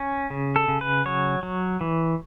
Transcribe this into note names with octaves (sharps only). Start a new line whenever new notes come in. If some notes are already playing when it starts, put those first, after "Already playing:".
Already playing: C#4
C#3
A4
C#3
B4
F#3 C#5
F#3
E3